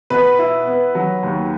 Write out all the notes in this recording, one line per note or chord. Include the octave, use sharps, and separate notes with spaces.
B2 B4
E4
B3
F#3
D#2